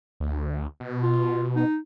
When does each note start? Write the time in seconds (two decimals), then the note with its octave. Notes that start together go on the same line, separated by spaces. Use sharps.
0.20 D2
0.80 B2
1.03 F4
1.56 D#4